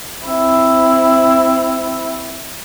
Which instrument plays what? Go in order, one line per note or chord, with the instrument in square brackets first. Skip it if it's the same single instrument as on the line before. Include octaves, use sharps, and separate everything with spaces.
[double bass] C4 E4